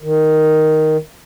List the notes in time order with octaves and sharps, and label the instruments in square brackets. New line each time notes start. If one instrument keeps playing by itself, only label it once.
[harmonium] D#3